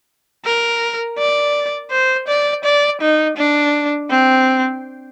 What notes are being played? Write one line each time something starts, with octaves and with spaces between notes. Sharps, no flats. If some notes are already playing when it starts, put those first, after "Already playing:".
A#4
D5
C5
D5
D5
D#4
D4
C4